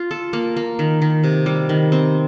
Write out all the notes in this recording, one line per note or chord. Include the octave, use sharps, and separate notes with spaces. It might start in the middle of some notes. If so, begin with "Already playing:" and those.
Already playing: F4
A4
A#3
A#3
D#3
D#3
C3
G3
D#3
C4